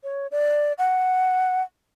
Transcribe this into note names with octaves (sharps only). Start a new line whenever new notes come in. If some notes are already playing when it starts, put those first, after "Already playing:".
C#5
D5
F#5